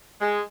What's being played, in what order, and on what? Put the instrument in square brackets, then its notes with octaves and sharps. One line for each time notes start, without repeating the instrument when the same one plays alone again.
[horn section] G#3